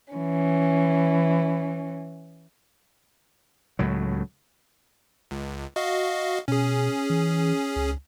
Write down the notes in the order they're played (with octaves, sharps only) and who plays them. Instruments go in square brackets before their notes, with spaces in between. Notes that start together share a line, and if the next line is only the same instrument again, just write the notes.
[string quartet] E3 C#4
[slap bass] C#2 A2 F#3
[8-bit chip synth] C#2
F#4 D#5 F5
[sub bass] B2 [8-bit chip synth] C#4 G#4
[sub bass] E3
C#2